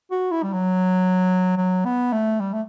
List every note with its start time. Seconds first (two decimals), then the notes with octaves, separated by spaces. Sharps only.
0.11 F#4
0.31 E4
0.43 G3
0.53 F#3
1.57 F#3
1.85 B3
2.13 A3
2.40 G3
2.53 A3